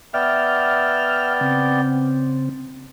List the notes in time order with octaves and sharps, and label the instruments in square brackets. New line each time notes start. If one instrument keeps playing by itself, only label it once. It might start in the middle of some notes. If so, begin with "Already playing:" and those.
[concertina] B3 D5 G5 [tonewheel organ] E5 F6
[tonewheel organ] C#3 C4